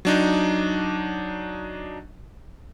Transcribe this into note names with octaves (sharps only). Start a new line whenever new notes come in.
F#3 D4 D#4